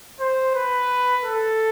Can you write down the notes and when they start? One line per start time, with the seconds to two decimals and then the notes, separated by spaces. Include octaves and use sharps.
0.20 C5
0.55 B4
1.25 A4